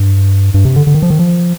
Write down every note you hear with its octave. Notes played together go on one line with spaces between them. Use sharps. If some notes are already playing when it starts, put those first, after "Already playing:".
Already playing: G2
G2
C3
D3
D3
D#3
F3
D#3
F3